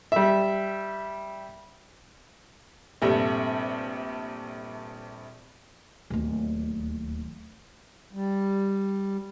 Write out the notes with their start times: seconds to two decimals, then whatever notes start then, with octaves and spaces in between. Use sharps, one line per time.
0.12 G3 E5
3.02 A#1 G2 C3 A3
6.10 D1 D#2
8.13 G3